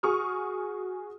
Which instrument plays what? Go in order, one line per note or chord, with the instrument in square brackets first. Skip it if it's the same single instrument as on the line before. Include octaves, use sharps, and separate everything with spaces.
[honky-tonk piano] F#4 G#4 C#6 D#6 F6